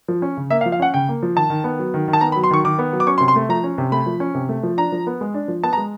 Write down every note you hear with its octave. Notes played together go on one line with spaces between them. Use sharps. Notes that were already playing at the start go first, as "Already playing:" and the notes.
F3
C#4
C#3
A#3 E5
F5
F3
F5
C#4 F#5
C#3 G5
A#3
F3
D#3 A5
D#3
B3
F#3
D#3
D#3
A5
B3 A#5
B5
F#3
C6
D#3 C#6
D#3 D6
B3
F#3
D6
C#4 C#6
C6
C3
C6
A3
F3 A#5
C#4
C3
A3 B5
F3
C#4
C3
A3
F3
D4 A#5
F3
B3
G#3
D4
F3
B3 A5
A#5
G#3